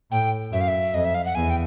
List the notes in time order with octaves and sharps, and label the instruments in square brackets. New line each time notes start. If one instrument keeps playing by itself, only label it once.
[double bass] A2 [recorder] G5
[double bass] F#2 [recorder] E5
[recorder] F5
E5
[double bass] F2 [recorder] D#5
[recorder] E5
F5
F#5
[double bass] E2 [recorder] G#5
[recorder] G5